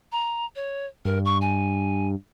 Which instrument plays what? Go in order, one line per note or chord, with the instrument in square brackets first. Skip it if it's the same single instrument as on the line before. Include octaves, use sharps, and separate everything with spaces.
[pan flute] A#5
C#5
[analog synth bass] G2 [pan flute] A#4
[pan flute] C#6
G#5